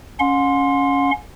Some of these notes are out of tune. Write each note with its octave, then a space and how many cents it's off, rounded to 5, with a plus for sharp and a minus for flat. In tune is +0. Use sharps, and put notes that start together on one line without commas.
C#4 +0 F#5 -45 C6 +0